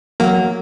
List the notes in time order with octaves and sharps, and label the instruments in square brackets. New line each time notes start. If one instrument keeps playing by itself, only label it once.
[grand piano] F#3 [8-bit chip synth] A#3